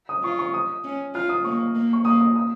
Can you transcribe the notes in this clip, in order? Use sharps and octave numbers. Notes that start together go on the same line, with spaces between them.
D#6
F4 C#6
C#6
D#6
C#4
F4 F6
D#6
A#3 C#6
A#3
C#6
A#3 D#6
D#6
D#6